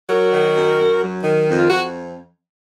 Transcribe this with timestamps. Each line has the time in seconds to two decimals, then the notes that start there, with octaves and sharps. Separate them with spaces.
0.10 F#3 F#4 A#4
0.32 D#3
0.56 F#2
0.78 F#2
1.01 F#3
1.23 D#3
1.47 F2
1.58 F4
1.68 F2 F#4